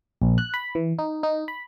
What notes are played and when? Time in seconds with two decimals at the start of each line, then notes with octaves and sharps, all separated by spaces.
0.22 A#1
0.38 F#6
0.54 B5
0.75 E3
0.99 D#4
1.23 D#4
1.48 B5